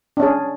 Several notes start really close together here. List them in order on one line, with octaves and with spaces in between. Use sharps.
D4 C#4 G#4